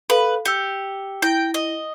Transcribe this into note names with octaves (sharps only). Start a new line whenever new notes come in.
A4 B4 F5 B5
G4 E6 C#7
E4 G5 A#6
D#5